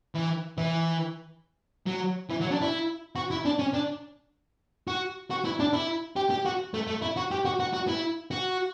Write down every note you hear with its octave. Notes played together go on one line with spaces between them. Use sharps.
E3
E3
F#3
E3
F#3
D4
E4
F#4
E4
D4
C#4
D4
F#4
F#4
E4
D4
E4
G4
G4
F#4
A3
A3
E4
F#4
G4
F#4
F#4
F#4
E4
F#4